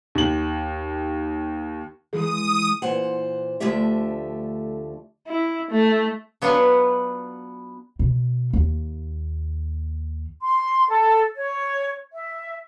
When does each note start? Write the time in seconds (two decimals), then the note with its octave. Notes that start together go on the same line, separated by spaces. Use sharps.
0.15 D#2 F#7
2.13 E3 G#3 G#4 D#6
2.82 A#2 E3 C5 F#5
3.60 D2 D3 F3 A3 G4 E5
5.27 E4
5.71 A3
6.42 F#3 B3 D4 F4 F#5 G#5
7.99 B2
8.53 D#2
10.40 C6
10.89 A4
11.35 C#5
12.13 E5